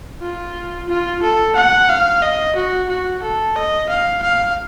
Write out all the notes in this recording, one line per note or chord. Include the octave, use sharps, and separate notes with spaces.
F4
F4
A4
F#5
F5
D#5
F#4
F#4
A4
D#5
F5
F5